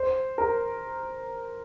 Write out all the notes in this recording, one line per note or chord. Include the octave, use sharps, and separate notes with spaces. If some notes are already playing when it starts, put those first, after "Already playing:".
Already playing: C5
A#4